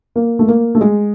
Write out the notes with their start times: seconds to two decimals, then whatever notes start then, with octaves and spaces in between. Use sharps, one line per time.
0.16 A#3
0.39 A3
0.48 A#3
0.75 A3
0.81 G#3